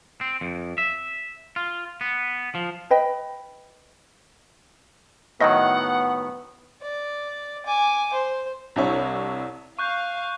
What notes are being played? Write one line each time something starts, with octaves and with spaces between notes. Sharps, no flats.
C4
F2
E5
F4
B3
F3
B4 D#5 G5 B5
A2 D#3 F#3 B3 D#5 F#5 A#6
D5
G#5 D6
C5
C2 C3 D4 E4 C#5
F5 C#6 F#6 G6